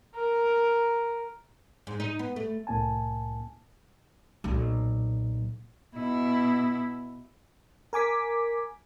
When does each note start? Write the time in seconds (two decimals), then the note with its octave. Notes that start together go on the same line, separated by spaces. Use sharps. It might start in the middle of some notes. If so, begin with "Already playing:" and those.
0.15 A#4
1.87 G#2
2.00 D#4
2.19 B3
2.36 A3
2.67 C2 A2 A#3 G#5 A5
4.44 B1 A#2
5.95 B2 E4
7.93 A#4 G#5 D6 B6